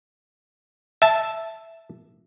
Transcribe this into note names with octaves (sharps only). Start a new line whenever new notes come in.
E5 A5